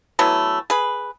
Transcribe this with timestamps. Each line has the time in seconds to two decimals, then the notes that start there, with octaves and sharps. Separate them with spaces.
0.19 E3 F#3 A3 B3
0.70 G#4 B4